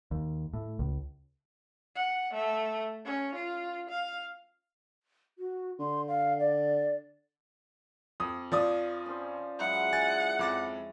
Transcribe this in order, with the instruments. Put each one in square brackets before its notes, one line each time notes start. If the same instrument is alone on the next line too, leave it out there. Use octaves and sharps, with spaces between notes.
[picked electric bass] D#2
A2
C#2
[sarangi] F#5
A3
C#4
F4
F5
[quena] F#4
[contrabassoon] D3 [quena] C6
[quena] F5
D5
[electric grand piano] F2 [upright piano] D#6
[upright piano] F3 D5 D#6
[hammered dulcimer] C#4 C5
[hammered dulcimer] F#3 G#3 E4 [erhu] F#5
[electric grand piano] G#5 A6
F2 D6 A6